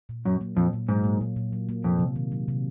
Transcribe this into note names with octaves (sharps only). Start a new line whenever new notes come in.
A#2
F#2 F#3
A#3
F2 A#2
A#2
G#2 F#3
A#3
A#2
A#2
F#3
A#3
F2 C3
C3
D#3
F#3
C3